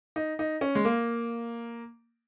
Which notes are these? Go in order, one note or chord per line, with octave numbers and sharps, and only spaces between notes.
D#4
D#4
C#4
G#3
A#3